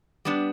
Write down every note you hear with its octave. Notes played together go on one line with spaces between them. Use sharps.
G3 B3 D4